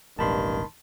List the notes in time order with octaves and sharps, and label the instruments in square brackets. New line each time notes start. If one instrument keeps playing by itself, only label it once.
[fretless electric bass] E1 A1 D4 [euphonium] G2 [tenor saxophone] D#3 [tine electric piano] A5 B5 C6